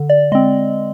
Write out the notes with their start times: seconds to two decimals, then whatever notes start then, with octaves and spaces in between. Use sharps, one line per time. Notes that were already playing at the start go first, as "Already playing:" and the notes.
Already playing: D3
0.10 D5
0.32 G#3 D#5
0.35 C4